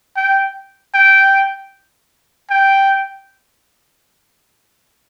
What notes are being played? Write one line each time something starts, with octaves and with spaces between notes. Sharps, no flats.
G5
G5
G5